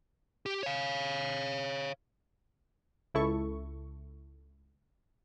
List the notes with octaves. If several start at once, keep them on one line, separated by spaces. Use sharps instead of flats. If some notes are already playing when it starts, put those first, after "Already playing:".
G4
C#5 F5
C#2 E4 A4 C#6